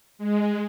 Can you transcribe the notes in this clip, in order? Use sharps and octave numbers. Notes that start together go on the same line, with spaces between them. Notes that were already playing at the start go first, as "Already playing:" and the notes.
G#3